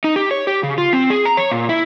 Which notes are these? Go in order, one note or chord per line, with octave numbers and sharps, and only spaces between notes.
D#4
G4
C#5
G4
C#3
F4
C4
G#4
A#5
C#5
A#2
E4